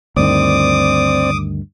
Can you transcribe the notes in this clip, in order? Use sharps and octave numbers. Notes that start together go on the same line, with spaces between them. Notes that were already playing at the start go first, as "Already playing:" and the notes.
D2 G2 D#3 C4 D5 D6 D#6